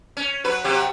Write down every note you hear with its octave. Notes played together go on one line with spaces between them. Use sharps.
C#4
F#3 B4
C3 F#3 G4